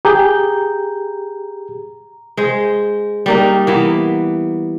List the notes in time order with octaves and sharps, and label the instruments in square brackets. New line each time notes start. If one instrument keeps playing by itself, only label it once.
[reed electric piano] G4 G#4 G6 [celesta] A#5
[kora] G#3 C5
G3 A#3 D#4
E3 A#3 B3